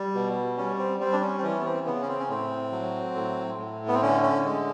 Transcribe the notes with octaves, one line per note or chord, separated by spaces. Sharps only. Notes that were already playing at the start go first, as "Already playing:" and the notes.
Already playing: G3
B2
G3 C#4
C4
G3 C4
D4
C#4
C4
E3 C#4
B3
C4
C#3 B3
C#4
C4
C#4
A2 C4
F#3
A2
A2
B3
C4
D3 C#4
C#4
G#3